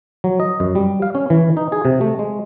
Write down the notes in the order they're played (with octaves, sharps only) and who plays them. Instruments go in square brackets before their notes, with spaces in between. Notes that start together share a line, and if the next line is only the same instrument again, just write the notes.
[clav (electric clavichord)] F#3
D#5
F#2
G3
F5
C#4
E3
D#4
G#4
C3
A3
G#3